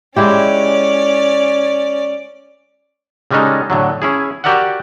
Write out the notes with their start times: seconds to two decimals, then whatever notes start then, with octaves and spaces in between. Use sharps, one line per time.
0.16 G#3 C#4 E4 G4 D5
3.31 C#3 G3 G#3 C#4 D#4 A4
3.70 A2 D3 F#3
4.02 C#4 E4 G#4
4.44 F#4 G4 A#4 D5 E5 F#5